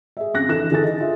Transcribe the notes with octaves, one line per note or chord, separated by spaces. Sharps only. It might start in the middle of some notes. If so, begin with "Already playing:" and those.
G#4 E5
F2 C#3 F#6 A#6
E3 D4 A4 F#6 A#6 E7
D3 E3 G#4 A4 G#5 A6
D#4
F4 G#4 E5